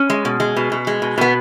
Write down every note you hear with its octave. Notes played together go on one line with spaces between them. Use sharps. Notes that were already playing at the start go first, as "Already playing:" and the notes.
Already playing: C#4
G#3
B2
G#3
B2
B2
G#3
B2
B2 B3